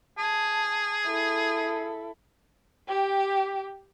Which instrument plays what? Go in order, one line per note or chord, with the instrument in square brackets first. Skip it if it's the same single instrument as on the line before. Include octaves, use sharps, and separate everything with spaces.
[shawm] G#4 [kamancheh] A5
[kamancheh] E4 A4
G4 G5